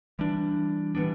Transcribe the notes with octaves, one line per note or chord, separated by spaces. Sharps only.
E3 G3 D4
E3 G3 B3 D4